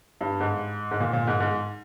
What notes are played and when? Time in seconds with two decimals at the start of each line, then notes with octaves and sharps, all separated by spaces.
0.21 G2
0.40 G#2
0.91 G#2
1.00 A#2
1.13 A#2
1.27 G#2
1.40 G#2